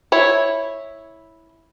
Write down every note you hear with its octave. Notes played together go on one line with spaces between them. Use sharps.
E4 C#5